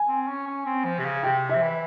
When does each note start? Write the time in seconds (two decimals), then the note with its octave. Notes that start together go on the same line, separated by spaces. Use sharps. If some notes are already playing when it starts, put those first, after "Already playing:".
Already playing: G#5
0.08 C4
0.28 C#4
0.47 C#4
0.66 C4
0.85 F3
0.99 C3
1.05 C#3
1.23 C3 G5
1.49 E5
1.56 F3
1.62 E3